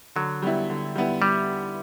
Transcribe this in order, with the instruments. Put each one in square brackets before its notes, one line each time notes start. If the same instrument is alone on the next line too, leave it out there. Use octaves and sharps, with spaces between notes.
[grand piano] D3 [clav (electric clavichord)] F#3
[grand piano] G3 B3 E4
D3
G3 B3 E4
[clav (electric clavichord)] G3